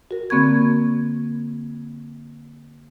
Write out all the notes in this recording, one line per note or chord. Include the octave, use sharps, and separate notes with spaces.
F#4 A#4
D3 A#3 C4 B5 C#6 G#6